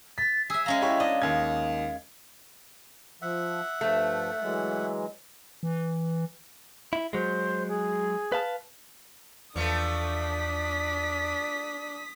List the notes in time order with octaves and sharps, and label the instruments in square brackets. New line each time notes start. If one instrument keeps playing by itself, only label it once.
[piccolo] A6 [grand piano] B6
[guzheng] G#4 E5 [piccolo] E6
[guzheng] G#3 C#4 A#5 [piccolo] F5
[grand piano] E4 G4 C#5
[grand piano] D4 [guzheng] D#5
[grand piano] D#2 G#6
[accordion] F3 [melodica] E5 F#5
[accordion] G2 F3 [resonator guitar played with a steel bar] A3
[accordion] E3 F#3 G#3
[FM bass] E3
[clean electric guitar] E4
[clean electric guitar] F#3 G#3 [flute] C5
[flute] G#4
[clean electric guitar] B4 F5 A5
[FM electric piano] E2 [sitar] F3 A3 [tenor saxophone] D4 [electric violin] D#6 B6